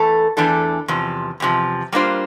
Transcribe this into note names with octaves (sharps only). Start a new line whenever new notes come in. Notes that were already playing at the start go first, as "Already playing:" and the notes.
Already playing: E2 E3 A3 A4
E2 E3 A3 D4 A4
E2 C3 F3
E2 C3 F3
G3 A#3 D4 F4 C5